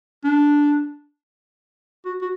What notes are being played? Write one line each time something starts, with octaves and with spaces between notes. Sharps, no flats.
D4
F#4
F#4